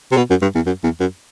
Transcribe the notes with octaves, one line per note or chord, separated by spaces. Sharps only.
C3
B2
F#2
G2
E2
F#2
E2
F#2